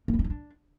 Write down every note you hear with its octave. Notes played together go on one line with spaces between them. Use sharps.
A#3
E4
C#4
D#4
D4